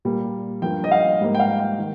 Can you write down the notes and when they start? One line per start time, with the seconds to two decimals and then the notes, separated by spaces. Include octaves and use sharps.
0.05 A#2 G3 A#3
0.62 G2 F3 A#3 G5
0.84 D#5
0.91 F5
1.21 G#2 G3 A#3
1.35 G5
1.40 F5
1.59 G5
1.79 D#3